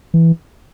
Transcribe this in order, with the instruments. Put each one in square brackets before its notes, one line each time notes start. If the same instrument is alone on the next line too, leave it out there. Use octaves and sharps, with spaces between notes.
[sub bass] E3